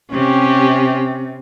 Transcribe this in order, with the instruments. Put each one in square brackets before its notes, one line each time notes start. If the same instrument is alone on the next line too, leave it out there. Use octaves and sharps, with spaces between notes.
[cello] C3 [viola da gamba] C#4 G4